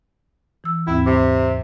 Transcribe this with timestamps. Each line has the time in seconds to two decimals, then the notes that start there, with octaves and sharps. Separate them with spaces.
0.64 E3 E6
0.87 D#2 G#2 C4 E4
1.06 C3 D6